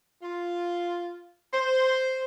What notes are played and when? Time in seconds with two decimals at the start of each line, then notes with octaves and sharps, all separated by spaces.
0.23 F4
1.53 C5